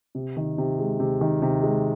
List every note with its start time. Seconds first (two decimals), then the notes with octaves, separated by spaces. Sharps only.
0.15 C3
0.37 D#3
0.58 C3
0.79 G#3
1.00 C3
1.21 D#3
1.42 C3
1.63 G#3